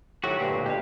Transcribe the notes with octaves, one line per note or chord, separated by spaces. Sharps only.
A2 D#3 F#3 F#4 G4
D2 G2 A#2 G#3
B2 G4 F5